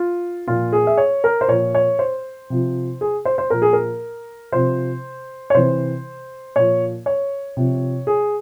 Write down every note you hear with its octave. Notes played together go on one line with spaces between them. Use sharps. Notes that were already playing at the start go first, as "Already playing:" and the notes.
Already playing: F4
A#2 F3 F4
G#4
E5
C#5
A#4
C5
A#2 F3 C#5
C#5
C5
C3 F3
G#4
C5
C5
A#2 F3 A#4
G#4
A#4
C3 F3 C5
C#5
C3 E3 C5
A#2 F3 C#5
C#5
C3 F3
G#4